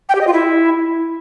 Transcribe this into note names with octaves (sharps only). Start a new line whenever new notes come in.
G5
G4
D#5
F4
E4